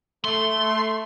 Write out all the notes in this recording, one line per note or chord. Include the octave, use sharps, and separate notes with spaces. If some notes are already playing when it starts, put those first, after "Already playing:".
A3 C6